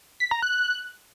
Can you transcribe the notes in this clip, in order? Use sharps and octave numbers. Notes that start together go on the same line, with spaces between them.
B6
A#5
F#6